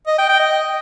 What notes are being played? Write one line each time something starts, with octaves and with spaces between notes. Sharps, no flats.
D#5
G5
G5
D#5